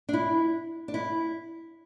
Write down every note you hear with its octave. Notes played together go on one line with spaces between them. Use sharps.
D4
E4
D4
E4